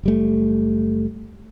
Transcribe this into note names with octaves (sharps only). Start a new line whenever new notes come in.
F#1 G3 A3